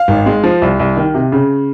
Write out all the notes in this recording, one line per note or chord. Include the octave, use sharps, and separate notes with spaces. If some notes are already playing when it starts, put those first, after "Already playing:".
Already playing: F5
G#1
G#3
F3
C2
C2
D#3
C3
C#3